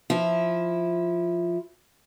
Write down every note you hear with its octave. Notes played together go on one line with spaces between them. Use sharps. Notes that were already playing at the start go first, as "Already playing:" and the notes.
F3 E4